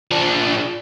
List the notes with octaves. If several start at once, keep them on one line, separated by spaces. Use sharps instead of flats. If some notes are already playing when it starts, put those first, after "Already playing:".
F3 D4